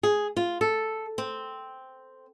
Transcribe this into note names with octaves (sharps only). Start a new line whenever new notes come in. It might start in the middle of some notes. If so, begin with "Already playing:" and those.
G#4
F4
A4
C4